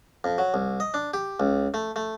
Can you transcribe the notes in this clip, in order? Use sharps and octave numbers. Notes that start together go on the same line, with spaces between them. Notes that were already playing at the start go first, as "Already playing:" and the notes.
F2
F#3
C2
D#5
D4
G4
C#2
A3
A3